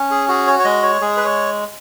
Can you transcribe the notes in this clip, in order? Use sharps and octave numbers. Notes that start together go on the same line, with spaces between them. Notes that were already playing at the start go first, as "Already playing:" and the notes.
Already playing: C#4
G#4
F#4 G#4
C#5
C#5
G#3 D#5
C#5
G#3 G#4
B4
C#5